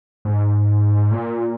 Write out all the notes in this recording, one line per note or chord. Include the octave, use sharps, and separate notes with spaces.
G#2
A#2